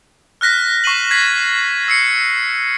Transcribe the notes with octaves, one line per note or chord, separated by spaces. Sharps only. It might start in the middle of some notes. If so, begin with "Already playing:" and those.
F6 F#6 A#6 B6
C#6 C7 D#7 F#7
G#6 B6 C7 F#7
E6 C7 C#7